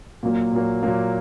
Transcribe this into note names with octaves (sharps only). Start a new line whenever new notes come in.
A#2 F#3 A#3
A#2 F#3 A#3
A#2 F#3 A#3